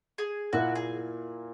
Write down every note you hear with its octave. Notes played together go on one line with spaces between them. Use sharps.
G#4
A#2 A#3 E4 F#4
G#4